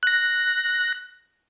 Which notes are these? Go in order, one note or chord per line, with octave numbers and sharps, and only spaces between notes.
F#6 A#6